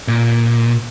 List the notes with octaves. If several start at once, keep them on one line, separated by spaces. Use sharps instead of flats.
A#2